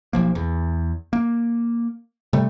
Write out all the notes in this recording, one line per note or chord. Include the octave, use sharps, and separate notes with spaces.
B1 F3 A#3
E2
A#3
C3 G3 A3